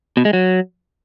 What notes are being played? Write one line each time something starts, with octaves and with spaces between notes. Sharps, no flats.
B2
G#3
F#3